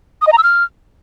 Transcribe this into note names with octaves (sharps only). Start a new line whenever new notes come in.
D#6
D#5
A#5
E6
F6